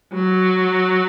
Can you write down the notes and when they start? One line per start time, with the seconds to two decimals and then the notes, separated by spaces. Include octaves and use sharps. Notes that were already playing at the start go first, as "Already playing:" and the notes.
0.14 F#3